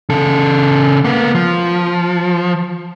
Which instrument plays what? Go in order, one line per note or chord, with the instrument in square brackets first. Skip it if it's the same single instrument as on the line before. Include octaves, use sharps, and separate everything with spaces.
[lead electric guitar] C#3 A4
A#3 B3
F3